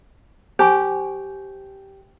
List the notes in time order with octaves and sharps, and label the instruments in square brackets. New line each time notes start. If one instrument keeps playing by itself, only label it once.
[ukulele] G4 [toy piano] C5 G#5 C#6